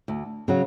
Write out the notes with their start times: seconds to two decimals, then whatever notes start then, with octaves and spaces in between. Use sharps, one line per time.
0.08 D2
0.48 C#3 F#3